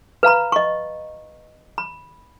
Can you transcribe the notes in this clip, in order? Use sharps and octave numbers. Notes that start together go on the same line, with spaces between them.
B4 F5 A#5 B5
D#5 C#6
B5